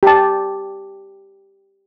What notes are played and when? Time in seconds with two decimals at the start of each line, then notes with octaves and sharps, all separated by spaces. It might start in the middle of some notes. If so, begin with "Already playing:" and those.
0.03 G4 A5